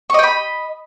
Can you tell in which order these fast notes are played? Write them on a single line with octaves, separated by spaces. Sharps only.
C#6 D#5 G5 B5